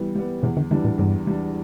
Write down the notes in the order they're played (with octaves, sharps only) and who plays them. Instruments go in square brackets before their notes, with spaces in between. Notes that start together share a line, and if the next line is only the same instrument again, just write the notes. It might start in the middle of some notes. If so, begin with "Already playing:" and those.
Already playing: [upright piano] E3 G3 B3
G3 B3
[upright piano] E2 [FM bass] B2
[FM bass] D3
[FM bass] D3 [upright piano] E3 G3 D4
[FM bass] A2
[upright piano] E2 [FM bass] G2
[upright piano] E3 G3 D4